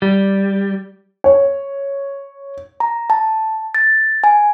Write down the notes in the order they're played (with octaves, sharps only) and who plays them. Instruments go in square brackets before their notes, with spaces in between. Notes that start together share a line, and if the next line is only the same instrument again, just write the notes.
[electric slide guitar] G3
[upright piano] C#5
[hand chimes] A#5
A5
A6
G#5